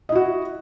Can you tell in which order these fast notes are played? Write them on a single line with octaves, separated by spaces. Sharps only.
D#5 E4 F#4